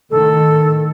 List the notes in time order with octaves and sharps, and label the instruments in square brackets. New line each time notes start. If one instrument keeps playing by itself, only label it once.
[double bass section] A2 D#3 [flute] A4